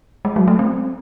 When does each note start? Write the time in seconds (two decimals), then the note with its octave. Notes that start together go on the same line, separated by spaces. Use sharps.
0.25 G#3
0.36 F#3
0.48 A3
0.59 C4